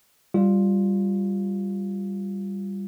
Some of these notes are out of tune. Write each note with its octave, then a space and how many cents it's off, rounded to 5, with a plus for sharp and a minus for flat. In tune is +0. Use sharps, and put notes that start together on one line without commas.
G3 +0 F4 +0